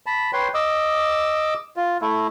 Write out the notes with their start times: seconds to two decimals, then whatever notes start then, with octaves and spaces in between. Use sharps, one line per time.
0.06 A5 B5
0.33 B4 C#5 G5 C6
0.54 D#5 D6 E6
1.76 F4
2.01 A3 E4